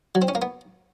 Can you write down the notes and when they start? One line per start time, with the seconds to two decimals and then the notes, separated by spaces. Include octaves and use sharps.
0.15 F#3
0.22 C4
0.28 C#4
0.35 A#3
0.42 B3